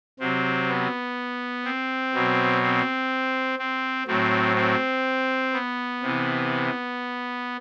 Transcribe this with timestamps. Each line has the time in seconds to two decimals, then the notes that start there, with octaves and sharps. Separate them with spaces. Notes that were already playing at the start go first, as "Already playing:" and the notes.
0.19 C3 F#3 C4
0.68 B3
1.65 C4
2.14 B2 F#3
2.62 C4
3.59 C4
4.07 A2 F#3 C4
4.56 C4
5.53 B3
6.02 C3 E3